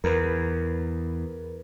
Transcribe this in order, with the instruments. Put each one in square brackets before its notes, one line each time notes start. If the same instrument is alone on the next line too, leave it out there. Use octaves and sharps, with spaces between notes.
[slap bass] E2 [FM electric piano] A#4 B4